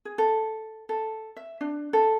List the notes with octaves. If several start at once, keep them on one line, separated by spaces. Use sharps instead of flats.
G#4
A4
A4
E5
D4
A4